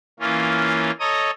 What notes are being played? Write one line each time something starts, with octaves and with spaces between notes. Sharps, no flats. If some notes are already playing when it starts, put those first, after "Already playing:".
E3 A#3 C#4 F4
A4 C#5 D#5 A#5 D#6